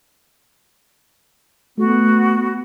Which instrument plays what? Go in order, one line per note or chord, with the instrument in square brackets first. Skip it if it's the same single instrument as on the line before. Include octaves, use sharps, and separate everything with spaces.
[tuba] A3 [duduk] B3 [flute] F#4